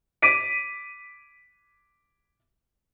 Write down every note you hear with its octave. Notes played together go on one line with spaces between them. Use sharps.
D6 B6 D7 D#7